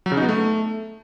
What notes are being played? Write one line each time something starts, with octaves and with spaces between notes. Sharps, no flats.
F#3
C#3
D#4
B3
A3